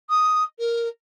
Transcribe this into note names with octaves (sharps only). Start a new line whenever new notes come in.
D#6
A#4